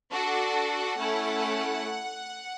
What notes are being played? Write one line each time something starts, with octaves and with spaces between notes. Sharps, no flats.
D4 F#4 A4 F#5
A3 C#4 E4